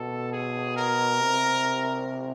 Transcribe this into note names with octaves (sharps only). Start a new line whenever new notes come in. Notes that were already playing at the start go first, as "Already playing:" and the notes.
Already playing: B2 A4
G#4
A#4
C3